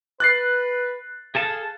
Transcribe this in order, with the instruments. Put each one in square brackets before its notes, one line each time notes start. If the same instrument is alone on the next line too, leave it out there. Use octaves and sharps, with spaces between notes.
[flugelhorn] B4 [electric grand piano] F#6 A6 C7
[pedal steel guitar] G#4 A4 A5 [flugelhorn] F5